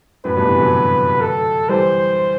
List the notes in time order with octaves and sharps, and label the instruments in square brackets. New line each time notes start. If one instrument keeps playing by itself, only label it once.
[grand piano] F#2 A2 [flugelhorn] B4
[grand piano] G2 B2
C3 E3
D3 F#3
[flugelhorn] A4
[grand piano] E3 G3 [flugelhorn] C5